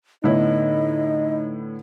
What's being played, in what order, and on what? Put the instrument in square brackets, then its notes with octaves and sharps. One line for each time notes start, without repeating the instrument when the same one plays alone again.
[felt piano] A2 E4 [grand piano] D3 B3 C#5 [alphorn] D#4 [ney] D#5